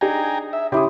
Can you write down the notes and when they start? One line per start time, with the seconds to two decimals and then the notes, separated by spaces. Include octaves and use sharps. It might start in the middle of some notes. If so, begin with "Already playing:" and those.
0.01 D4 D#4 G#4 G5 G#5 A#5
0.53 E5
0.72 C#3 E4 G4 C6 D#6